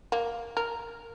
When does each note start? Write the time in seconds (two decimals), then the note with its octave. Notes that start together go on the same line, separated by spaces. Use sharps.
0.12 A#3
0.57 A#4